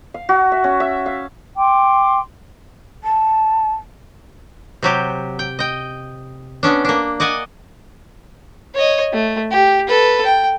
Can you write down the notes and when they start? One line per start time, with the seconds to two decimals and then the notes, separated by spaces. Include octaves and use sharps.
0.14 F5
0.29 F#4
0.52 E5
0.64 C#4
0.80 E5
1.06 F5
1.57 G5 C6 D6
3.04 A5
4.83 C3 F#3 G4
5.39 G5
5.59 D#5 G5
6.63 B3 C#4 D4
6.85 A#3 D4
7.20 D5 D#5 F#5 G#5
8.74 C#5 D#5
9.13 A3
9.51 G4
9.87 A4 B4
10.26 G5